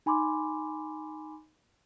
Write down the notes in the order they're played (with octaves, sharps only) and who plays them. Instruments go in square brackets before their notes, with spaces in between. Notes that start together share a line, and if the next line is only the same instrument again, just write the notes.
[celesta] D#4 G#5 B5 C6 D6